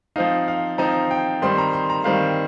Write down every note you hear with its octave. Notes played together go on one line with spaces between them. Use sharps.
F3 C4 D#4 F5
F5
F3 C4 D#4 A#5
G5
D#3 G3 C4 C6
A#5
C6
A#5
D#3 G3 C4 F5